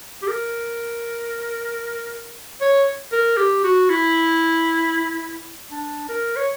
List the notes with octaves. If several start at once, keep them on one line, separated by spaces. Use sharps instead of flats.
G4
A#4
C#5
A#4
G4
F#4
E4
D4
A#4
C#5